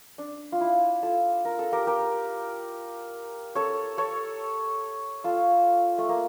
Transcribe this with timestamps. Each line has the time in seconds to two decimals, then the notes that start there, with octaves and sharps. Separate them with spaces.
0.18 D4
0.52 F4
0.61 E4
1.03 F4 A4
1.45 A#4
1.59 A4
1.72 G4 A#4
1.87 G4 A#4
3.55 A4 C#5
3.98 A4 C#5
5.24 F4 A4
5.98 A3
6.09 A#3